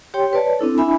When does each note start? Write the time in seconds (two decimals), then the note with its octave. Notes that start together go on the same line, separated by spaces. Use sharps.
0.14 G4 C#5 G5 C6
0.33 B4 C#5 D5 A5
0.59 C4 D4 E4 A4
0.78 D4 E4 E5 G#5 B5